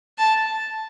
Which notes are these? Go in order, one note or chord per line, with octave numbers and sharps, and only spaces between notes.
A5